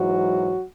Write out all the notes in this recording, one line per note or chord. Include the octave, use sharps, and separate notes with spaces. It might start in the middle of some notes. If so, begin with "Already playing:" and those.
Already playing: G#2 E3 F#3 F#4